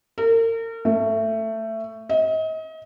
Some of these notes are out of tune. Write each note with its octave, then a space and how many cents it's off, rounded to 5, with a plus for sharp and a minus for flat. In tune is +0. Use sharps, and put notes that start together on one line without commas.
A#4 -35
A3 +15
D#5 +35